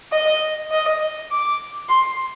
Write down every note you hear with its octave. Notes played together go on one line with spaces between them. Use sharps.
D#5
D#5
D6
C6